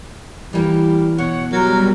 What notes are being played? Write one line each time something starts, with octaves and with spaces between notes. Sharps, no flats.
E3 G3 A#3
B2 C#5 F#5
F#3 G3 A#4